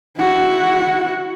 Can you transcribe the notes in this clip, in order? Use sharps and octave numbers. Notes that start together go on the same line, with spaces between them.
E4 F#4